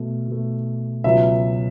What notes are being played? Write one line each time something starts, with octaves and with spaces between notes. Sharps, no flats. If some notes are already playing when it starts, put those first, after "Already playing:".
Already playing: B2 A3
B2 A3
C#2 B2 F#3 B3 E5